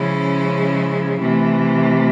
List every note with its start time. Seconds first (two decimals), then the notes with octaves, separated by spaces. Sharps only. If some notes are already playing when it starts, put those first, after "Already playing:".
Already playing: C#3 F3 G#3 C#4 E4
1.20 C3 E3 A3